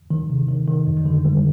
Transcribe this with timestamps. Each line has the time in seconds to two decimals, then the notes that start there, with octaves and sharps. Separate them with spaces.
0.10 D#3
0.30 C3
0.49 D#3
0.68 D#3
0.87 F2
1.05 D3
1.25 G3